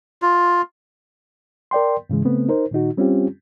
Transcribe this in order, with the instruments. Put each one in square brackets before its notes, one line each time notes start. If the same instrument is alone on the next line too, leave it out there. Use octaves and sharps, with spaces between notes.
[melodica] F4
[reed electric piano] A#4 D5 G5 C6
G#2 C#3 E3 G#3
C#3 A3 B3 C4
D#4 A#4 C5
A#2 D#3 D#4 F#4
G3 C4 C#4 F4 G4